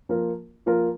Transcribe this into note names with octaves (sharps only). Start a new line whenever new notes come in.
F3 A#3 F4 A#4
F3 A#3 F4 A#4